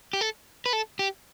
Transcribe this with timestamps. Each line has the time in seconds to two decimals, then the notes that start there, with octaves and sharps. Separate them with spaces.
0.13 G4
0.21 A4
0.66 B4
0.73 A4
0.99 G4